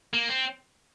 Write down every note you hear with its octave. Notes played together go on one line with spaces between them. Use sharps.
A#3
C4